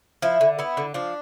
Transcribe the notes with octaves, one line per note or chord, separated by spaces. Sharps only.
F3 E4
D3
B3 E4
D3
F3 D4